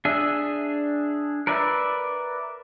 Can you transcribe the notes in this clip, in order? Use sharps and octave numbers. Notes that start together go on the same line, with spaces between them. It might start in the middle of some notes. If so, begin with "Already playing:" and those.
D4 G#4 E5
A#4 B4 D5 E5